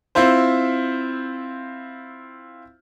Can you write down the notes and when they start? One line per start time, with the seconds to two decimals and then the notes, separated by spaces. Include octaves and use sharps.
0.15 C4 E4 F4 C5